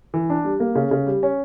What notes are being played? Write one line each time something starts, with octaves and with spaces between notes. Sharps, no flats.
E3
D4
G3
A#3
C#3
C#3
G3
C#4